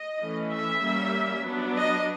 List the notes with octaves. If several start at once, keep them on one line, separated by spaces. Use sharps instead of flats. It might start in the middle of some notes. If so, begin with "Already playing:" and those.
Already playing: D#5
E3 A3 C#4
E5
G3 A#3 C#4
F#3 B3 D4
D#5